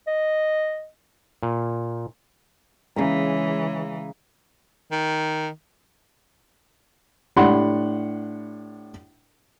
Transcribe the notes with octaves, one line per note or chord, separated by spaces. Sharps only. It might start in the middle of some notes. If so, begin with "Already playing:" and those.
D#5
A#2
C#3 E3 G#3 A#5
D#3
A2 D4 G4 F#5 B5 C6